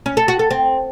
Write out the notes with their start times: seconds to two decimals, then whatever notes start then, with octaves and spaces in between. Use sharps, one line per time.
0.06 C#4
0.17 A4
0.28 F#4
0.39 A4
0.51 C4